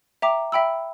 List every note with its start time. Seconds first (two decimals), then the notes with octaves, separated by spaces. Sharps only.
0.22 E5 G5 A#5 D6
0.52 E5 G5 B5 E6